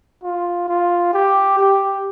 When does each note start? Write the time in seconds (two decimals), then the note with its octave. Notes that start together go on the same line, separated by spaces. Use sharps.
0.23 F4
0.68 F4
1.14 G4
1.59 G4